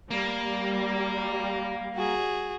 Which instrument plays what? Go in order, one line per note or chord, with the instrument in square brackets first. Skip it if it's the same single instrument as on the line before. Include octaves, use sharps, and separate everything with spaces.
[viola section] G3 [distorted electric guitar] A#3
[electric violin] F#4 G#4